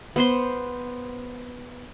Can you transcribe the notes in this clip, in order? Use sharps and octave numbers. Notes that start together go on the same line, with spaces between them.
B3 C5 C6